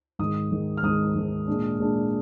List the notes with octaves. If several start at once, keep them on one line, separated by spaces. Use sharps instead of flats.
G#2 D#3 G#3 D#6
G#2 D#3 G#3
F6
G#2 D#3 G#3 D#6
G#2 D#3 G#3
A#2 G#3 D4
A#2 G#3 D4